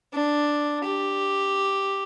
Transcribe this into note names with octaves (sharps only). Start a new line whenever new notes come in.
D4
G4